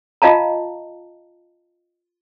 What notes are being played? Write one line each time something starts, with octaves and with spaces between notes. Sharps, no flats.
F4 D#5 F5 A5 A#5